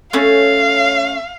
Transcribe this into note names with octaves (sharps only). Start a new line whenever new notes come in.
A3 C#4 F5